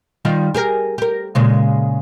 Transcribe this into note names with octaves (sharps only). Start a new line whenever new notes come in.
D#3 G3 F4
G4 G#4 A#4
G4 A#4
A#2 C#3 G#3